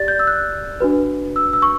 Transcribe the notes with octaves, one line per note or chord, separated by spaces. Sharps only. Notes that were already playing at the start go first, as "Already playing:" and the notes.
Already playing: G4 D5 A6
G6
E6
F#6
D4 F#4 B4
E6
E6
C#6